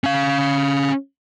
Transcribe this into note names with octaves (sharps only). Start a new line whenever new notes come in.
C#4 F5